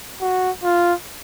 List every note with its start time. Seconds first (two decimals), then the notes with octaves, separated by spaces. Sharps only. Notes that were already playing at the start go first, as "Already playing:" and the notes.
0.21 F#4
0.64 F4